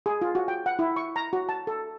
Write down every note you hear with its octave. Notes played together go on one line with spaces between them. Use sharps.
G#4
F4
F#4
G5
F#5
E4
C#6
A#5
F#4
A5
A4